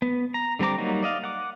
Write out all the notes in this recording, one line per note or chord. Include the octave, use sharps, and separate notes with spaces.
B3
A#5
D3 G3 C4 A#5 D6
F#3 G3 A#3 D#4 F#4
D5 D#5 F5
F#5 D6